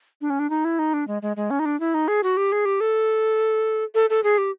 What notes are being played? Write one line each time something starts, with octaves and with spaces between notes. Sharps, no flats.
D4
C#4
D4
D#4
E4
D#4
D4
G#3
G#3
G#3
C#4
D#4
D4
E4
D#4
G#4
F#4
G4
G#4
G4
A4
A4
A4
G#4
G4